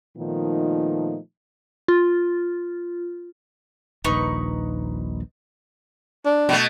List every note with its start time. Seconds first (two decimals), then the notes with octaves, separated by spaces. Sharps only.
0.17 A#2 D#3 F3 A3 B3 D#4
1.88 F4
4.05 D#1 A#1 D#4 B4 C#6
6.25 D4
6.49 B2 A3